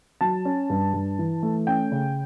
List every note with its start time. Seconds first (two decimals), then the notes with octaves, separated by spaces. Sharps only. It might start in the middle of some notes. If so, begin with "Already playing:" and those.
0.21 F#3 A5
0.45 C#4
0.70 G2
0.93 G2
1.19 E3
1.43 A3
1.67 C#4 G5
1.92 C#3